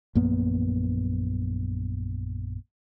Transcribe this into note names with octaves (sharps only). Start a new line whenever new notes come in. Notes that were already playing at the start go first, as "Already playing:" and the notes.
A#1 F#2 A#3 B3